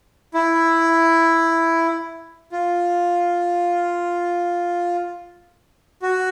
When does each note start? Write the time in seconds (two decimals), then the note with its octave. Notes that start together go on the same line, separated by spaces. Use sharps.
0.34 E4
2.52 F4
6.02 F#4